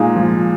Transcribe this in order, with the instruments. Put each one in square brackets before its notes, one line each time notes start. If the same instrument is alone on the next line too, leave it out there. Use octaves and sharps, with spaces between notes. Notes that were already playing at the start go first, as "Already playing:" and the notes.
Already playing: [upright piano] A#2 [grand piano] G#3 D#4 G#4
[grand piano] F3